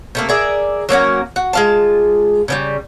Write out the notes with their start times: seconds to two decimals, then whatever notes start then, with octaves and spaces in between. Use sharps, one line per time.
0.15 C3 A3 A#3
0.29 G#4 A#4 D5 E5
0.89 F#3 A#3 C#4 F#4
1.36 F#4
1.53 G#3 F4 A5
2.48 C#3 F3 G3